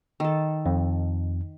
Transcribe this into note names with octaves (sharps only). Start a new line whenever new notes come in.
D#3 A4
F2